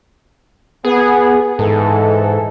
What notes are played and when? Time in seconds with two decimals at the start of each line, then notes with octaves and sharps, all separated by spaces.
0.85 B3 G#4
1.59 G#2 E3 A4